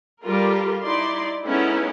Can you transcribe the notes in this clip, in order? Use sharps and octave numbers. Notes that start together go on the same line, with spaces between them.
G3 F4 G4 A4 A#4
D#4 E4 D5 C6
G#3 B3 C#4 D#4 E4 A4